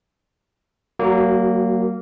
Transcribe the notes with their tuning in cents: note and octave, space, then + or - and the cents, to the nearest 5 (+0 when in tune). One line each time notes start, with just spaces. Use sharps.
F#3 +35 A#3 -10 F#4 +0